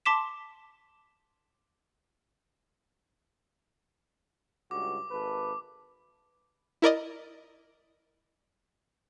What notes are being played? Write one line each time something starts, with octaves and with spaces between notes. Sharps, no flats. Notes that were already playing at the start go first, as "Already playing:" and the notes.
A5 C6 D6 B6 E7
C#2 G2 F#4 D6
G#1 A4 B4
E4 A#4 D5 D#5